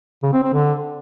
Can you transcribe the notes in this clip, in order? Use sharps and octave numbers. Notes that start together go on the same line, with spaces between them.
C#3
C4
C4
D3